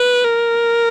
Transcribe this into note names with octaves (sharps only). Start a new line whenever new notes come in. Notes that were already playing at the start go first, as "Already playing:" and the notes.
Already playing: B4
A#4